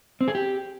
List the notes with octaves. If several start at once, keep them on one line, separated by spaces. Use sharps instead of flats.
C4
G#4
G4